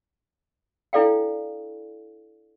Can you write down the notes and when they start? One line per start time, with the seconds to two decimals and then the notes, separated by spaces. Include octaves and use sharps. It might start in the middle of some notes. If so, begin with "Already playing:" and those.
0.93 D4 E4 A4 D5 F5 G5